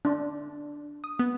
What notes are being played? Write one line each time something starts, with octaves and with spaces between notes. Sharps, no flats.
D4
D#6
B3